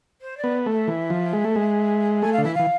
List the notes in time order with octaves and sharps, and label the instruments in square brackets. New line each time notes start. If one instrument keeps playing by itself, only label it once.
[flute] C5
D5
[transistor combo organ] B3
A3
[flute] E5
[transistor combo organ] E3
F3
G#3
A3
G#3
[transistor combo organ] A3 [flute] G#5
[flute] F5
[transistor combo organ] D3
[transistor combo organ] E3 [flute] E5
[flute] F5
[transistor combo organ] E3